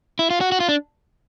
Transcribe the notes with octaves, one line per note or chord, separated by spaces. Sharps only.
E4
F4
F#4
F#4
F4
D4